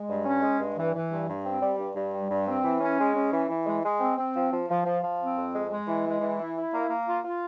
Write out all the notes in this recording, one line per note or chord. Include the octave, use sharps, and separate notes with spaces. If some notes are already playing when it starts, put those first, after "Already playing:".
Already playing: G#3
G2
C#4
G#3
G2
E3
E3
G2
G2
C4
G3
G2
G2
G3
G2
C4
E3
C#4
G#3
C#4
E3
E3
G#3
G#3
C4
C4
F3
F3
F3
F3
F3
C4
F2
G#3
G#3
E3
G#3
E3
E4
E4
A#3
A#3
F4
F4